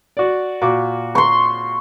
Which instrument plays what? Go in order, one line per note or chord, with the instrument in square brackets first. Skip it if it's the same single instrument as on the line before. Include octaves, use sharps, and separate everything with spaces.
[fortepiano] F#4 D5
A#2 F#4 D6
[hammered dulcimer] C6 C#6